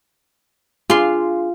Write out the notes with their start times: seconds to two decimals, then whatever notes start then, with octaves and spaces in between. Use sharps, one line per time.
0.90 D4 F4 G#4 C6